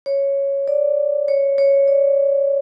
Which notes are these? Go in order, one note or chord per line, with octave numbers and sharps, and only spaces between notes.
C#5
D5
C#5
C#5
D5